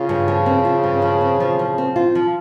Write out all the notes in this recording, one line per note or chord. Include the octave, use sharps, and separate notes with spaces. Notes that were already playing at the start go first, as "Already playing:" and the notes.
Already playing: C#3 F4
G2
F3
C4
F4
G2
F3
C4
F3
F3
C4
F4
F3